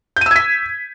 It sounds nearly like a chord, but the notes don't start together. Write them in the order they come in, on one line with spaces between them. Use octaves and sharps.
G6 D#7 E6 G#6 B6